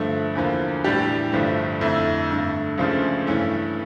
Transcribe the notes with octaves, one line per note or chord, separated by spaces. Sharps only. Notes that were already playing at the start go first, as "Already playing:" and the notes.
Already playing: G2 D3 F3 A3
E2 D3 F3 A#3
A2 E3 G3 D4 G4
G1 G2 D3 F3 A3
F2 D3 A3 E4
G2 D3 A3
C#2 C#3 F3 A3 D4
G2 E3 A3 C#4